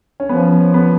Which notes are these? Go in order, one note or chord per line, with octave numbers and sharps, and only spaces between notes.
C#4
F3 B3
B3